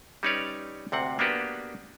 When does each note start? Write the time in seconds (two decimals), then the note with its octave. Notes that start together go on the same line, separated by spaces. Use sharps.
0.23 G3 C#4 D#4 B4 C#5 D5
0.92 D2 C3 C4 F#5
1.19 A#3 B3 D4 F#4 G4 B4